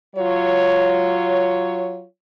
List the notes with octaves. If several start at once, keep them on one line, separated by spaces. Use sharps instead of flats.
F#3 F4 C#5